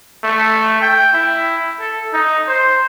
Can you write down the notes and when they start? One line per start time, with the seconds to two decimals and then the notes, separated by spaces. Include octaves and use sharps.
0.24 A3
0.82 G5
1.14 E4
1.80 A4
2.13 D#4
2.48 C5